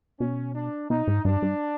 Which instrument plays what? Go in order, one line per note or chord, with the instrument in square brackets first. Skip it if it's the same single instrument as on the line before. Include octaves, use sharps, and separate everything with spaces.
[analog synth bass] B2 [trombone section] C#4
[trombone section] D4
[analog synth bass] B2 [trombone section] D#4
[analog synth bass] G#2
[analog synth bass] G2 [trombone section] D4
[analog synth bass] G2